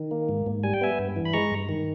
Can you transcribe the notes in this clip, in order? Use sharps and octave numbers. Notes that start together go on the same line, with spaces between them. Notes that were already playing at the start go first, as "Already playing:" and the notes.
Already playing: D#3
A#3
G#2
G#2
G3 G#5
G5
B3 E5 G#5
G2
E3
B5
G#3 A#5 C#6
G2
D#3